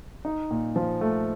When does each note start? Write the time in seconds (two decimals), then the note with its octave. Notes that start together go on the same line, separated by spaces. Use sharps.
0.25 D#4
0.51 A#2
0.76 F3
1.01 A3